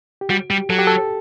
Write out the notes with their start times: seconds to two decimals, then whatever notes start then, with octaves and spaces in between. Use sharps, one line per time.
0.21 G4
0.30 G3 F#4
0.50 G3 G4
0.70 F#3 A4
0.79 G4
0.87 A4